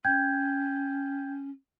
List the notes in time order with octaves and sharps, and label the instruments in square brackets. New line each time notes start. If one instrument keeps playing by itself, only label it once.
[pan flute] C#4 [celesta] G5 G6 G#6